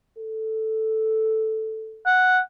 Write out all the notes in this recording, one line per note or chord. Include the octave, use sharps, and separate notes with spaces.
A4
F#5